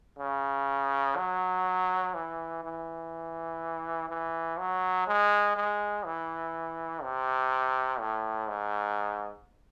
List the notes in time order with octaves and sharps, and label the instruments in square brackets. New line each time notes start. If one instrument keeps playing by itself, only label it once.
[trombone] C#3
F#3
E3
E3
E3
F#3
G#3
G#3
E3
C3
A2
G#2